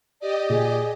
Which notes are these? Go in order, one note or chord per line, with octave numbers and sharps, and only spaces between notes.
G4 D5 D#5
A#2 G#4